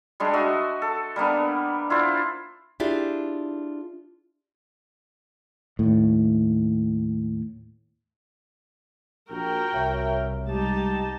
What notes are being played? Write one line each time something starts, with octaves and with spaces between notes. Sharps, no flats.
G3 G#3 D4
F#4 D#5 E5
A4
G3 A#3 B3 D4
E4 F4 C5 D5
D4 E4 F4 G4 G#4 D5
D#2 A2
A#1 F#4 A#4 G5
C2 C#5 E5
G3 G#3 D#4 G4 A5